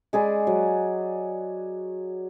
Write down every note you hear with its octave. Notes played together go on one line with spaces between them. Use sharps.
G#3 G#4 D5 B5
F#3